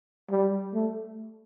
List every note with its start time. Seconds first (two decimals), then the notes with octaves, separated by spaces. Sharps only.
0.31 G3
0.74 A3